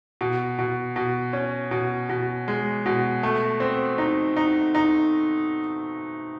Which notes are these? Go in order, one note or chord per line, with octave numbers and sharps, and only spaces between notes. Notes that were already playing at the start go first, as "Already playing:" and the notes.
B2
B2
B2
C#4
B2
B2
G#3
B2
A3
C4
D#4
D#4
D#4